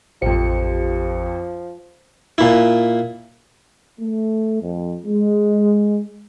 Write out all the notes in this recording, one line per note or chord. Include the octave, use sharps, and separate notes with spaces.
A1 F2 F3 G4 C5 C#7
A#2 E4
A3
F2
G#3